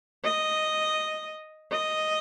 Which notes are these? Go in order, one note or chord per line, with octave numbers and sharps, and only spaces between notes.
D#5
D#5